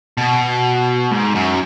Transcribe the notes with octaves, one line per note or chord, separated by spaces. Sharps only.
B2
G#2
F#2